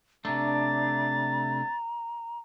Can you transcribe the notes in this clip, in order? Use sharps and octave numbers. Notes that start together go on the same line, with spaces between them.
C3 A3 D4 A#5 A6